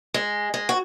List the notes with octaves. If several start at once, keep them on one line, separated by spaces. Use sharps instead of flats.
G#3
G#3
F#4